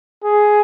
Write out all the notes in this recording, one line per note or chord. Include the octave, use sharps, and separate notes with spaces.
G#4